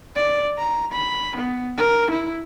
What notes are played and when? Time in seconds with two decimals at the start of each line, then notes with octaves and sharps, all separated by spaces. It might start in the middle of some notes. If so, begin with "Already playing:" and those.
0.16 D5
0.59 A#5
0.92 B5
1.36 B3
1.77 A#4
2.10 E4